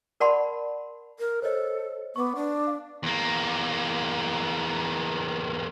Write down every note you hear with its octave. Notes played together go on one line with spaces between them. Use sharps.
A#4 D5 F#5 A5 B5 C6
A#4
A4 C5 C#5 D#5
B3 C#6 D6
D4
F5
E2 A#3